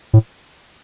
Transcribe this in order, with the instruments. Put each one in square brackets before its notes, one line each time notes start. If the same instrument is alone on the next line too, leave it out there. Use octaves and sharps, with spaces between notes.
[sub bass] A2